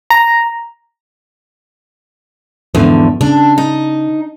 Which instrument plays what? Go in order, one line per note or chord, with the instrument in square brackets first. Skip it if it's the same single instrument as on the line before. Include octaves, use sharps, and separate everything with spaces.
[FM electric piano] A#5
[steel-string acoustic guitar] E2 D3 [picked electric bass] G#2 F3
[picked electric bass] C#3 [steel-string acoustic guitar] D4
[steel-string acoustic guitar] D#4